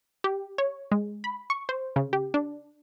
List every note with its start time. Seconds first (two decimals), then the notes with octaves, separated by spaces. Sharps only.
0.24 G4
0.58 C#5
0.92 G#3
1.24 B5
1.50 C#6
1.69 C5
1.96 C#3
2.13 G4
2.34 D4